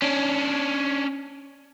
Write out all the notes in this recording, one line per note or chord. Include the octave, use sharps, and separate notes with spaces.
C#4 D4